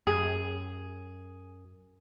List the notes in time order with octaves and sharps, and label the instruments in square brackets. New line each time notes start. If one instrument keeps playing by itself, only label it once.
[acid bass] F#2 [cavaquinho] G#4